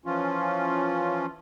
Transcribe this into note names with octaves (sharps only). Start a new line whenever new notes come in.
E3 F3 C#4 F4